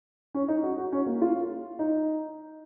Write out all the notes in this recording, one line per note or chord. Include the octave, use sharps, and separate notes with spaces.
C#4
D#4
F#4
F#4
C#4
A#3
F4
D#4